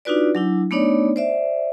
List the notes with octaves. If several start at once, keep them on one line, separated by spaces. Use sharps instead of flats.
D4 D#4 F4 F#4 B4 D5
F#3 D4 E4
A3 B3 D4 D#4 C#5 D5
C5 D5 E5